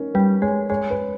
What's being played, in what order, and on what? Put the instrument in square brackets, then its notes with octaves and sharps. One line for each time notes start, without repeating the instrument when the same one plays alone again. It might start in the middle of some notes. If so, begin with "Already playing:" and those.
Already playing: [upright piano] C#4 D#4 A#4
[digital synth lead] G3 [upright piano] B4
[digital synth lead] G#3 [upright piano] C#5
[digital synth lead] G#3 [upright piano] C#5
[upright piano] B4